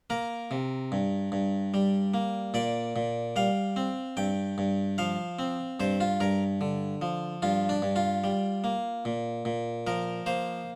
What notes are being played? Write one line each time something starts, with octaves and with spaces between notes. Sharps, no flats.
A#3 A#4
C3
G2
G2
G3
A#3
A#2 D5
A#2
G3 F5
C4
G2 G5
G2
F3 F5
C4
G2 C5
F4
G2 A#4
D3
F3
G2 F4
D4
G2
F4
G3
A#3
A#2
A#2
F3 A#4
A#3 C5